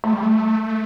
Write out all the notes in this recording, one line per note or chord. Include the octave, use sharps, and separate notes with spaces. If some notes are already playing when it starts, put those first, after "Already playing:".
A3
G3
A3